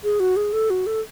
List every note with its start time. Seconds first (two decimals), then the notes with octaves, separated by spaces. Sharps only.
0.04 G#4
0.20 F#4
0.36 G#4
0.53 A4
0.70 F#4
0.86 A4